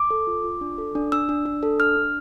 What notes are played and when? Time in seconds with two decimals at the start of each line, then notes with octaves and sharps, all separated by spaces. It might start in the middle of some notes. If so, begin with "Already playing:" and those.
Already playing: D6
0.10 A4
0.27 F4
0.44 F4
0.61 D4
0.78 A4
0.95 D4
1.12 D4 E6
1.29 D4
1.46 D4
1.63 A4
1.79 D4 F6
1.96 D4